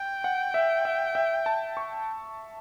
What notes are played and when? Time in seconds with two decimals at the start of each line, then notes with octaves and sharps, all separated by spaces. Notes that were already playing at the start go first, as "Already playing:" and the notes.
Already playing: G5
0.24 F#5
0.54 E5
0.85 E5
1.15 E5
1.46 A5
1.77 C#6